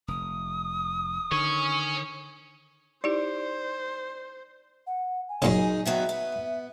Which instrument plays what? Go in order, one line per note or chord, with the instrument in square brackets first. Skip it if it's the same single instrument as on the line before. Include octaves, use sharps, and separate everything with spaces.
[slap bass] F1 [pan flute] D#6
[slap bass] D3 D#3 [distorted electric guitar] C#5 G#5 [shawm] C#6
[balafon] D#4 E4 G4 [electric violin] C5 [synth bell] D5
[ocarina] F#5
G#5
[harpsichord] F#2 A#2 C#3 [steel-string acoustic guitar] D#4 G#4
[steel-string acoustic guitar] D#3 F#3 B3 [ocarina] E5
[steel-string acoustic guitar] B3